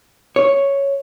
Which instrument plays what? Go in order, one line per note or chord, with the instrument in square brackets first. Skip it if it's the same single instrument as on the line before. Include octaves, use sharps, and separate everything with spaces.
[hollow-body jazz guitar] C#5